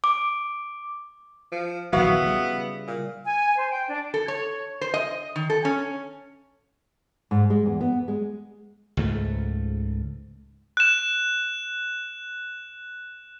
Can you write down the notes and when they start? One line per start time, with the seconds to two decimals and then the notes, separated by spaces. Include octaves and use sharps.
0.04 D6
1.52 F3
1.93 A#1 D#3 F#3 B3 E4 F#4 F5
2.22 C#3 G3
2.88 A#2
3.24 G#5
3.57 C5
3.70 G5
3.89 D4
4.14 A4
4.28 C#5
4.81 C5
4.94 D#5
5.36 D#3
5.50 A4
5.65 C#4
7.31 G#2
7.50 G#3
7.66 E2
7.81 B3
8.08 G#3
8.97 C#2 G#2 A3
10.77 F#6 E7